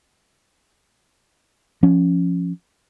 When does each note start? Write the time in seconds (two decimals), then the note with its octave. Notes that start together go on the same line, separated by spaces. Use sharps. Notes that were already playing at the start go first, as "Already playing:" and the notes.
1.83 F3 C#4